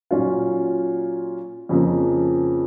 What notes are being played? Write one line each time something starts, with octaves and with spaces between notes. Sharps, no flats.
A#2 F#3 C#4 F4
F2 C#3 F3 A#3